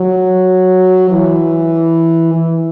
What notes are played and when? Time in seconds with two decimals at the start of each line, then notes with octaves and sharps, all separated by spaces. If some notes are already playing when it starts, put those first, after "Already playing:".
Already playing: F#3
1.11 E3
2.33 E3